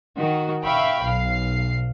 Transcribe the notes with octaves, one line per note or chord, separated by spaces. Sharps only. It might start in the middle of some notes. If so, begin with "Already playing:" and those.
D#3 F#4
E5 F5 G5 B5 C#6
B1 F5 C7